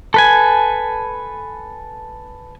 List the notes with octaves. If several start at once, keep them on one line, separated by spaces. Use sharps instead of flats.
A4 B4 G#5